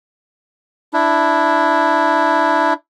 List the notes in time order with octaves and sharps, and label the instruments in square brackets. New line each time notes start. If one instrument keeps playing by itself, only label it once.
[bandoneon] D4 E4